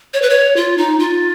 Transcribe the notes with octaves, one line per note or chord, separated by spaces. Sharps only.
C#5
B4
C#5
F4
D#4
F4